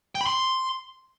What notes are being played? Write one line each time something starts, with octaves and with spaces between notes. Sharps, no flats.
G5
B5
C6